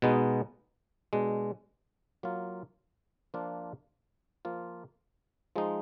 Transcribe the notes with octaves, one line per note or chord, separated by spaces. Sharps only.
B2 G#3 B3 D#4
B2 G#3 D4
F#3 A#3 F4
F3 A#3 D4 F4
F3 A#3 F4
F3 G#3 D#4